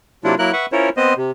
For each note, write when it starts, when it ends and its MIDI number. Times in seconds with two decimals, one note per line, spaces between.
0.24 0.35 48
0.24 0.35 54
0.24 0.35 58
0.24 0.35 62
0.24 0.35 64
0.24 0.35 65
0.39 0.52 54
0.39 0.52 58
0.39 0.52 64
0.39 0.52 70
0.39 0.52 90
0.53 0.66 71
0.53 0.66 76
0.53 0.66 78
0.53 0.66 85
0.72 0.89 61
0.72 0.89 64
0.72 0.89 65
0.72 0.89 70
0.72 0.89 72
0.72 0.89 73
0.97 1.14 59
0.97 1.14 60
0.97 1.14 72
0.97 1.14 75
1.17 1.31 48